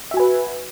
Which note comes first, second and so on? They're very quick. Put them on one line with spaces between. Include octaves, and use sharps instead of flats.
E5 F#4 G#5 B4